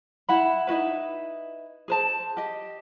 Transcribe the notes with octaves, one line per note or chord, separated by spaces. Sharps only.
E4 F#5 B5
D#4 E4 F#4 B4
G#4 C5 A5
G4 D#5